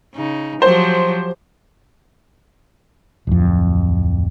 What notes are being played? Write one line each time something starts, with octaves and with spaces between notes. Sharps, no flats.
C#3 D#4
F3 F#3 G4 C5
D1 F2